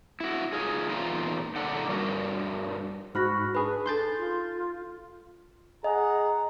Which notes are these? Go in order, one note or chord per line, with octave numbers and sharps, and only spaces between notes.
E4 F#4
D#4 F4 G#4
E2 A#2 D#4 F4 F5 A#5
A#2 D3 D4 D#4 F#5
G2 G3 F#4 A#4
G#2 F#4 B5 F6 F#6 A#6
D4 G#4 B4 B5
D#4 A4 C6 G6 A6
F4
G#4 D#5 F#5 A#5